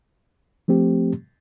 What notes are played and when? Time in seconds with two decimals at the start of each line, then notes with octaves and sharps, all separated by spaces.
0.68 F3 A3 C4 G4